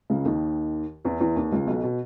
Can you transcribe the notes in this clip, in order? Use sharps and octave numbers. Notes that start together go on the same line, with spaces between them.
C#2 C#3
D#2 D#3
E2 E3
E2 E3
D#2 D#3
C#2 C#3
B1 B2
B2